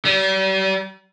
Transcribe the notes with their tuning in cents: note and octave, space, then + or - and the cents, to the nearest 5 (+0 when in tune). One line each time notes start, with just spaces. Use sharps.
G3 -40